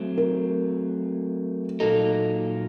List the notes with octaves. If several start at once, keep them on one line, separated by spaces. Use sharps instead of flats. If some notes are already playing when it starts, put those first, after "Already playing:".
Already playing: F#3 A3 C4
A#4
A#2 F#3 A#3 D#4 A4